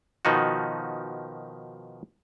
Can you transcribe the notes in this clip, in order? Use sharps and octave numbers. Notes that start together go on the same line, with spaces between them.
B2 D#3 F3 D#4 F#4